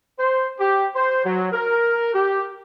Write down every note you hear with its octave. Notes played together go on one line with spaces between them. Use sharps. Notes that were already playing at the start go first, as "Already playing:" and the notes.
C5
G4
C5
F#3
A#4
G4